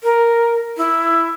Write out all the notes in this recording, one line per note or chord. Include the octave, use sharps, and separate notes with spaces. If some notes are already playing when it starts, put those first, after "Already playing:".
A#4
E4